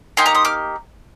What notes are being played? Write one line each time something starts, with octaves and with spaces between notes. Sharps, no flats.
A#3 D#4 G4 G#5 C6
A#5 D6
C6 D#6
D6 F6